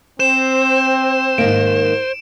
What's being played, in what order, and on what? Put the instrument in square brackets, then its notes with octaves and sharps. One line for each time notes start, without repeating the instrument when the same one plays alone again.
[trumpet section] C4 [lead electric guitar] C5 [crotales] E7
[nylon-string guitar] G#2 D#3 A#3 [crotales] D7